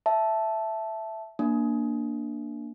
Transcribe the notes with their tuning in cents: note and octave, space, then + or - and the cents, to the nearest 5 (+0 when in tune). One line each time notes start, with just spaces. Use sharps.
E5 +0 A5 -10
A#3 +0 D4 +0